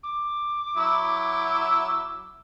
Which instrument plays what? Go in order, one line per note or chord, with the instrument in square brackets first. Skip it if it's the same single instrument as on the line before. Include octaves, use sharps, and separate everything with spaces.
[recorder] D6
[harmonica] F#3 E4 E6